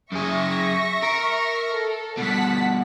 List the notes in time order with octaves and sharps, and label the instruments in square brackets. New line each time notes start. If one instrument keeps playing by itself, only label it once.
[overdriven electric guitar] F#2 G#4 [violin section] E5 C#6 A#6
[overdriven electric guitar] A#4
[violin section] A4
[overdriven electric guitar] G2 B2 [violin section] F#5 A5 B6